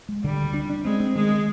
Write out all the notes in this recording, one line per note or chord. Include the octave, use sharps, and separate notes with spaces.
G#3
D3 G3
D2
D4
D4
G#3 C4
C4
D#3 G#3